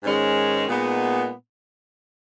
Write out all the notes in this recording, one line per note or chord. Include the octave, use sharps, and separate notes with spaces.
G#2 D#3 G#3 C#4
A#2 G#3 B3 D#4